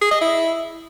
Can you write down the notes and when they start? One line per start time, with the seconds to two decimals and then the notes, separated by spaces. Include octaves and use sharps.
0.01 G#4
0.11 D#5
0.21 E4